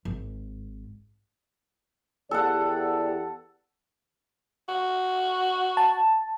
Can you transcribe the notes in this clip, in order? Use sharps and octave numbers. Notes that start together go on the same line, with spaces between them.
G#1
E2 G4 A4 D5 F#5
F#4
A5